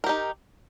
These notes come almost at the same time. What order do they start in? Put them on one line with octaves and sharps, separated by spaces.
A#4 G4 D#4